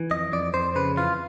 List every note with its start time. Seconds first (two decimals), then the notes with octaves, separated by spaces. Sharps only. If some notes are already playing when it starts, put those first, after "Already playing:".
Already playing: E3
0.11 F2 D#5
0.32 F2 D5
0.54 F2 C5
0.76 C#3 B4
0.97 E3 F4